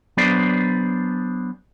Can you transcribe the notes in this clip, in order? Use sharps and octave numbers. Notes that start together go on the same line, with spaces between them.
F#3 B3 D4 G#4 C5 D5